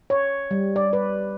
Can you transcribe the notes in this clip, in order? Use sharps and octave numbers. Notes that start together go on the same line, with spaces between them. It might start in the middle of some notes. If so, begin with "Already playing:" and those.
C#5
G3
D5
B4